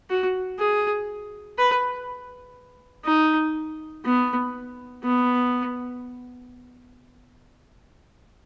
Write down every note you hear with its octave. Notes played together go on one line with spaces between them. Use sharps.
F#4
G#4
B4
D#4
B3
B3